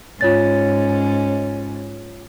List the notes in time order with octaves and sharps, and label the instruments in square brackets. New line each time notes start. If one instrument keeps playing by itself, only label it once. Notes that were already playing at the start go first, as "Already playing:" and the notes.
[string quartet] G#2 C#4 [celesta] F4 C#5 A6